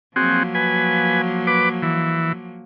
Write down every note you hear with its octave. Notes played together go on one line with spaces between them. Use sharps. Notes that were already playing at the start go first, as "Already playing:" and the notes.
F3 F#3 A#3 C4 F#4 G#4
B4 G#5
B4 D6
E3